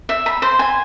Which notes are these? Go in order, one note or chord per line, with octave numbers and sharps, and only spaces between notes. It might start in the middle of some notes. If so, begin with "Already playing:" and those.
E5
B5
C5
G#5